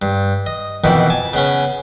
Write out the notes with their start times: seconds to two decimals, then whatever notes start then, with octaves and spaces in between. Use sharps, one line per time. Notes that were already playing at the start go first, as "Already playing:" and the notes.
0.02 G2
0.46 D#5
0.84 F2 B2 D#3 E3
1.10 G#5 A5
1.33 C#3 B3 C#4